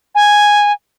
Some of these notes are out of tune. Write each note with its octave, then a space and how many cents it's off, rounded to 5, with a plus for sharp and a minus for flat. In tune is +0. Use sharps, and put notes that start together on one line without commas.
G#5 -5